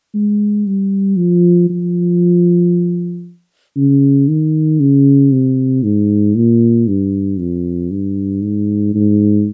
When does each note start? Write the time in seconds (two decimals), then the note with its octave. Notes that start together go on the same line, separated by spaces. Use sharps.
0.14 G#3
0.66 G3
1.18 F3
1.70 F3
3.76 C#3
4.28 D#3
4.80 C#3
5.31 C3
5.83 G#2
6.36 A#2
6.87 G2
7.39 F2
7.91 G2
8.42 G#2
8.94 G#2